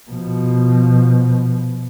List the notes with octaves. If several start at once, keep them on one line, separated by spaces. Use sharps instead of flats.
B2 F3